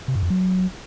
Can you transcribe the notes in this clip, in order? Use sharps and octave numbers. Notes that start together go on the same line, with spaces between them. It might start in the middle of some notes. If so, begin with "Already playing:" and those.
C3
G2
F2
F#3